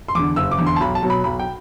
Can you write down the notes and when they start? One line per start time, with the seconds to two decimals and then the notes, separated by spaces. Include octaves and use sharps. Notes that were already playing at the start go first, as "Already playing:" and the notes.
0.08 C6
0.15 E2 D3 D6
0.36 F#1 E6
0.51 D6
0.59 E2 D3
0.67 C6
0.76 A5
0.80 B1 B5
0.95 A5
1.03 B2 F#3
1.10 B5
1.24 B1 B5
1.39 G5